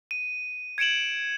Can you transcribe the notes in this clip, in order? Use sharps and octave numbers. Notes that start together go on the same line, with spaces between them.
D#7
G#6 C#7 D7 E7 F#7